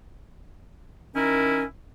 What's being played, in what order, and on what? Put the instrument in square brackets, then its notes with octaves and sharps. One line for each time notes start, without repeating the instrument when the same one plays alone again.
[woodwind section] D#3 C#4 E4 A#4